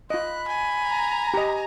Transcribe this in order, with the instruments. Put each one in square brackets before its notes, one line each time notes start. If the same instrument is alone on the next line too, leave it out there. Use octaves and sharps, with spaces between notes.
[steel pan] F4 D#5 [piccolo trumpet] B5 [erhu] F#6
[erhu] G#5
[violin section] A#5
[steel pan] G4 D#5